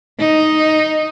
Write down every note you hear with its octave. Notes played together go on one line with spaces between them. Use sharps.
D#4